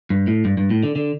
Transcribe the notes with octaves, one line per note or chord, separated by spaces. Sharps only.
G2
A2
G2
G2
A2
D3
D3